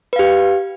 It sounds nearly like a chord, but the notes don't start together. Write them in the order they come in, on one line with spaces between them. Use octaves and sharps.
B4 F5 G4